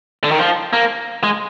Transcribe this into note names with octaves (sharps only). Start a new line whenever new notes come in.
D3
D#3
F3
A#3
G#3